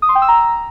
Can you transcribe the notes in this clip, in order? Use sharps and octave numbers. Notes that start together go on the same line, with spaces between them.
D#6
C6
G5
E6
A#5